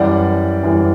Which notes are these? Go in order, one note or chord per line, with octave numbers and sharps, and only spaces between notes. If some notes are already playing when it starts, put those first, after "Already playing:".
Already playing: F#2 E3 G3 D5 F#5
F#2 E3 G3